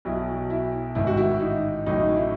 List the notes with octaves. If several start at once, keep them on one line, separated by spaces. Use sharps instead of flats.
B1 B2 F#3 E4
E4
A1 G#2 D#3 E4
F#4
E4
D#4
A1 A2 F#3 D#4
E4